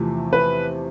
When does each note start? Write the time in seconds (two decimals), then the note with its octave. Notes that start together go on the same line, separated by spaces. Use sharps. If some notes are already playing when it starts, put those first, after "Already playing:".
Already playing: E2 C3 F3 A3
0.33 B4